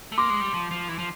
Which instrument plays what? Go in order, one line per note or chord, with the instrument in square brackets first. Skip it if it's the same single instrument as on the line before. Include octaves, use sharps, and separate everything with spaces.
[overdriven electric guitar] A3
[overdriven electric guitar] A#3 [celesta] C6 D6
[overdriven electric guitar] G#3
G3
F3
F3
E3
F3